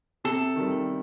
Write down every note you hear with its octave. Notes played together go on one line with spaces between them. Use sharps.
C3 A4
D#3 G3